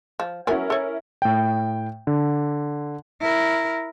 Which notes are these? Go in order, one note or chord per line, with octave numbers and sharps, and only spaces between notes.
F3
F#3 B3 C#4 E4 A#4 G#5
A4 C#5
A2 G5
D3
E4 A#4